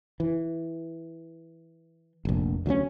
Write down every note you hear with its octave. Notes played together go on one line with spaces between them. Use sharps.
E3
F1 A#1
D2 F#3 A3 C#4